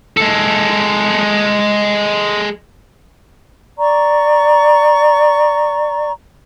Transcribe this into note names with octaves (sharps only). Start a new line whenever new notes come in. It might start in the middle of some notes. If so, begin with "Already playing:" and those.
G#3 A4
D5 A#5 C#6